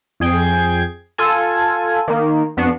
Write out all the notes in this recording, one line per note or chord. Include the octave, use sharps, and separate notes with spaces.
F2 G#4 G5 G#6 C7
F4 A4 G#5
D#3 A#3
F2 B3 D4 F#4 C7 C#7